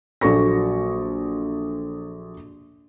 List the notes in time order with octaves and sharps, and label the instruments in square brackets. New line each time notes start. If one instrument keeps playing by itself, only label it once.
[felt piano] A#1 F#3 A4 C#6 A#6